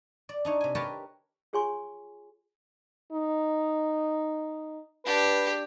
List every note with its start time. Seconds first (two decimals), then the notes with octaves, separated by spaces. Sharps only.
0.29 D5
0.45 D4 D#4 C#5
0.61 C3 G#5
0.75 G4 A#4 B4 C#5 G5 A5
1.53 F4 G#4 C#5 G#5 C6 C#6
3.13 D#4
5.05 D4 G4 B4